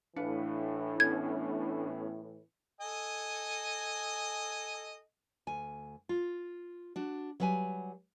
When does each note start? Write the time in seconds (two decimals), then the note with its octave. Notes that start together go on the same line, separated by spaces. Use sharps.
0.16 A2 E3 D4 B4 F5 C#7
1.00 B3 C#4 A4 G#6
2.81 A4 D#5 G#5
5.47 D2 G#5
6.09 F4
6.96 D4 F#4
7.40 F#3 G3 B4 G5 G#5